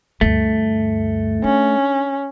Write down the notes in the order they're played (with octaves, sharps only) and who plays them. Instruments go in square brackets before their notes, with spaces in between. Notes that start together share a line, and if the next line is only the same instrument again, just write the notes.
[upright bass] D2 G2 [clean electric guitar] A3
[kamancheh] C#4 [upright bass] D4